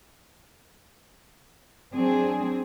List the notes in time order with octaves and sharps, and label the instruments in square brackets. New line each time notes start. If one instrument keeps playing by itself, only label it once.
[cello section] F#3 C4 D4 G#4